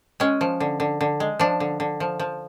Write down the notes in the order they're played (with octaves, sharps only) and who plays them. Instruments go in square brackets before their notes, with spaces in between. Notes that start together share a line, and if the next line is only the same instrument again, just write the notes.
[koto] G#3 C#4
F3
D3
D3
D3
G#3
F3 D4
D3
D3
F3
F3